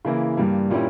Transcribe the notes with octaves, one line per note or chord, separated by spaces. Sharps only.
C#3 E3 A#3 E4
G2 G3 A#3
A#2 G3 A#3 C#4 E4